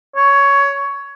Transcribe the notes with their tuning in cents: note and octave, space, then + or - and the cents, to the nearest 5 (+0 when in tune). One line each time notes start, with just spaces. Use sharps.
C#5 +15